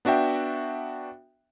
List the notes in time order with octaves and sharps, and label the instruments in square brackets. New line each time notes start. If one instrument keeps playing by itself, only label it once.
[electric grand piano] B3 D4 F#4 E5 G5